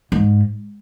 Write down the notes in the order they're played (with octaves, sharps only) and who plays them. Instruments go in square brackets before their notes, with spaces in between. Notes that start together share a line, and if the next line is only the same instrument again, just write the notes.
[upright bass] G#2